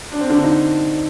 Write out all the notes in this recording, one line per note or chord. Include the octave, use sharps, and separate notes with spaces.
D4
C4
D3 D4
D#4